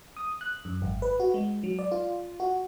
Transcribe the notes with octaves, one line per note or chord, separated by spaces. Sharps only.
D#6
F#6
F#2
G#1
B4
F#4
G#3
F#3
D5
F4
F#4